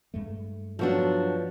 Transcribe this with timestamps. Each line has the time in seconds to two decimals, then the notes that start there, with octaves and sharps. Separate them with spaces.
0.14 G2 G#3 A3
0.79 F3 F#3 B3 D4 F#4 A4